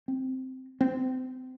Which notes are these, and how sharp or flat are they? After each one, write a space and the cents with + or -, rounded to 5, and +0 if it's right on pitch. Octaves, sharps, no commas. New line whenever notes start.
C4 -5
C4 -30